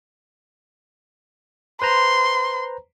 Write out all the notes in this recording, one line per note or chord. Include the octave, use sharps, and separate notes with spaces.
B4 C5 A#5 C6